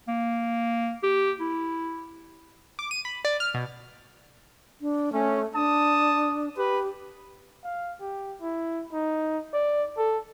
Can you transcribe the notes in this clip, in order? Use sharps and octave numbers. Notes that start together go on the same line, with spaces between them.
A#3
G4
E4
D6
D#7
B5
D5
F6
B2
D4
A3 C#4
D4 A5 D#6
G4 B4
F5
G4
E4
D#4
D5
A4